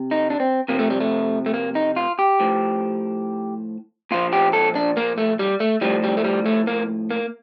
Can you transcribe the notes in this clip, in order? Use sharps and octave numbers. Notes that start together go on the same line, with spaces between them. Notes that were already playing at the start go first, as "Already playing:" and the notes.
Already playing: C3
D#4
D4
C4
C3 F3 A#3
A3
G3
A3
A3
A#3
D#4
F4
G4
A2 F3
A#2 F3 F4
G4
A4
D4
A#3
A3
G3
A3
A2 F3 G3
G3
A3
G3
A3
A#3
A#3